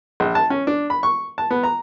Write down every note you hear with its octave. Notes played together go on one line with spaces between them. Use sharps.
A#1
A5
C#4
D4
B5
C#6
A5
B3
A#5